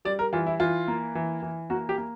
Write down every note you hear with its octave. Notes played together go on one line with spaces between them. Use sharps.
G3 D5
A#4
E3 F4
E4
E3 F4
A#3
E3
E3
A#3 F#4
G4
A#3